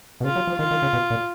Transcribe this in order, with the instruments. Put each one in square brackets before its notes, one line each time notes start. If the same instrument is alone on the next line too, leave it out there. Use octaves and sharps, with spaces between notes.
[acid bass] B2
[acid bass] C#3 [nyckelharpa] F4
[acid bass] F#3
F3
[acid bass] D#3 [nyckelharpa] F4
[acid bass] D#3
C#3
B2
A#2